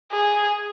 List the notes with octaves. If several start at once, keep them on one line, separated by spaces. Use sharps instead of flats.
G#4